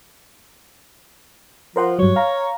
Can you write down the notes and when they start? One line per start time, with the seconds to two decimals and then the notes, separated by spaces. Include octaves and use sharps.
1.76 F3 A#4 C5 F#5
1.99 G2 F#3 C#5
2.16 F5 A#5